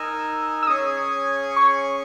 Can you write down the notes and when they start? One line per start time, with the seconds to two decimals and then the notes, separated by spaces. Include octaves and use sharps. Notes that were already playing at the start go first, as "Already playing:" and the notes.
Already playing: D#4 A#4 D#5 G#5 E6
0.63 E6
0.67 C#4 G#4 C#5 G#5 D#6
1.57 C#6